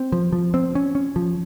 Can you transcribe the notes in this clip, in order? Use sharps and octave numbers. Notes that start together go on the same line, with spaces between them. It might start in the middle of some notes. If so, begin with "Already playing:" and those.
Already playing: C4
F3
F3
C4
C#4
C#4
F3